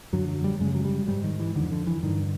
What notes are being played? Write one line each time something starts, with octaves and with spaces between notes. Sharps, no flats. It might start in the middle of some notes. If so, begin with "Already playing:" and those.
F#2 D3 F#3
F#3
G3
F#2 C#3 G#3
F#3
G3
G#2 G3
D#3
E3
F2 D3 D#3
D3
E3
G2 D3 D#3